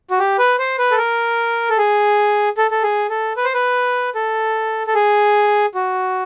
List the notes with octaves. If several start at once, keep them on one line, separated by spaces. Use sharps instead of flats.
F#4
G4
B4
C5
B4
A4
A#4
A4
G#4
A4
A4
G#4
A4
B4
C5
B4
A4
A4
G#4
F#4